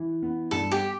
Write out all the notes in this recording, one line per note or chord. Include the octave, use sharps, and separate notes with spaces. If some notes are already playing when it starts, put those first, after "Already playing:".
Already playing: E3
B3
G2 A4
G4